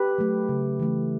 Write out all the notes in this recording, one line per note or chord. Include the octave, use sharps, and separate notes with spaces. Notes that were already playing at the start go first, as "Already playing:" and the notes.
Already playing: G4 B4
F#3 A3
C#3
E3 A3